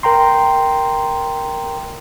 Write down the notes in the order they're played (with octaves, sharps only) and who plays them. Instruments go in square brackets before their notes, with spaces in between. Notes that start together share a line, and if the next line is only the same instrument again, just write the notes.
[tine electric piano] A#4 G5 A#5 C6